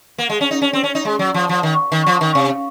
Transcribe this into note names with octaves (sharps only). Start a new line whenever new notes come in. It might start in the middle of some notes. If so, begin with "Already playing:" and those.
A#3
G#3
C#4
D#4
C#4
C4
C#4
D#4
G#3
F#3
F3
F3
D#3
D#3
F3
D#3
C3